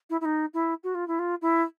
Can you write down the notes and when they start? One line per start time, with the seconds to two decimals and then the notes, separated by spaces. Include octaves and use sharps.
0.10 E4
0.21 E4
0.25 D#4
0.54 E4
0.84 F#4
0.95 F4
1.08 E4
1.19 F4
1.42 E4